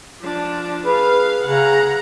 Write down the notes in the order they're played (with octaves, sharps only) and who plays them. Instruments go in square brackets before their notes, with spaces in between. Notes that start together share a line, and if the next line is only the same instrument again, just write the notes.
[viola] F3 D4
[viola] G#4 F5 [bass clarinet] B4
[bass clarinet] C#3 [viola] F#5 A#5